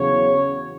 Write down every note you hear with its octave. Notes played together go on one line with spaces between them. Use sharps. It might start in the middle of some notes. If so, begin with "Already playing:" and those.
Already playing: E2 C#3 F#3 C#5